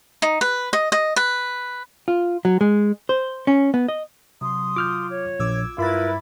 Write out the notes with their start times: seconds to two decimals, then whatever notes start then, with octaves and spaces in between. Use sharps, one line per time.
0.22 D#4
0.41 B4
0.73 D#5
0.92 D#5
1.16 B4
2.08 F4
2.45 F#3
2.61 G#3
3.09 C5
3.47 C#4
3.74 B3
3.88 D#5
4.41 C3 F#3 C6 D#6
4.76 F4 D6 F6 G6
5.09 C#5
5.39 A#1 D6 E6 G#6
5.78 G2 E4 F4 A#4 B4 B5 A6